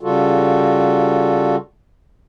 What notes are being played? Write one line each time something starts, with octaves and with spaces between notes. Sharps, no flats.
C#3 G3 F4 F#4 A4